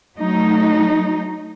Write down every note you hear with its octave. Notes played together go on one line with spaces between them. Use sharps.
F#3 A3 D#4